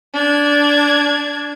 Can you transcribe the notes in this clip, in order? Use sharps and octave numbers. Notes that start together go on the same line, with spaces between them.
D4 G#6